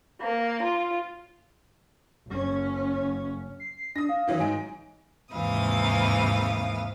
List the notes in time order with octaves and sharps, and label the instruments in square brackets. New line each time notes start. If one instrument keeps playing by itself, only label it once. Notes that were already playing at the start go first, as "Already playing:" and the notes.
[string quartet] A#3
F4
[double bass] F#1 C#4
[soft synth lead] C7
[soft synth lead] D4 [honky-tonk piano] D#6 A#6
[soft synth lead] F5
[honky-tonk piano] D#3 E3 F#3
[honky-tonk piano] G#2 D#4 D7 [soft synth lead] G#5
[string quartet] D#2 G#2 C3 E3 F5 D#6